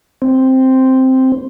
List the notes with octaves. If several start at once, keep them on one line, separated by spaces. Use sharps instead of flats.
C4